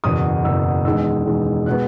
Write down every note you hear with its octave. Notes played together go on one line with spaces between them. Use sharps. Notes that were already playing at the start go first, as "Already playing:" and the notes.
F#1 E2 B2 D#6
F#1 E2 B2 E6
E1 E2 D#3 G#3 E6
E1 E2 D#3 G#3
B2 G#3 B3 F#6